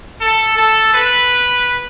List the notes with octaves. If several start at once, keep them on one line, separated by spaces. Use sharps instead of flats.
A4
A4
B4